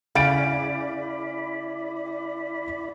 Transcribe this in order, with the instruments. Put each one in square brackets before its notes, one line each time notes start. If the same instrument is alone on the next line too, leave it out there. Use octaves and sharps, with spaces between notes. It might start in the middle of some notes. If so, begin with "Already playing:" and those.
[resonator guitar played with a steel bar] C#3 [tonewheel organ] E4 D5 B5 [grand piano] F5 A6 D7